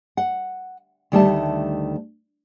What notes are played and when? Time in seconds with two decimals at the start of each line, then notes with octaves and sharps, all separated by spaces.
0.17 F#5
1.12 D2 D#3 G3 A3 E5 A5